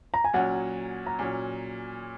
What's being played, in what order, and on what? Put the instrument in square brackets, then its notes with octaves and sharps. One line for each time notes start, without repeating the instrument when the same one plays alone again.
[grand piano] A#5
G#5
[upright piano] A#2 F#3 C#4 [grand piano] F#5
[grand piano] A#5
[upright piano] A#2 F#3 C#4 [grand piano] G#5